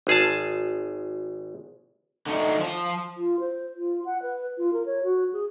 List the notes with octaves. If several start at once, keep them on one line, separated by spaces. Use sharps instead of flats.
G#1 G#4 A5
D3 A3 D#4
F3 C5
F4
C5
F4
F#5
B4
F4
A#4
C#5
F#4
G#4